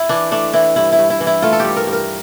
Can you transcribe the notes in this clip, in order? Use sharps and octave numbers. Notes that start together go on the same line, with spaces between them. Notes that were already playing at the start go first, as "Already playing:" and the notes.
Already playing: E4
E3 D4
A3 D4
E3 E4
G2 E4
E4
G2
E4
E3
E4
A3 F4
A4
G2 G4
A#4
G2
A#4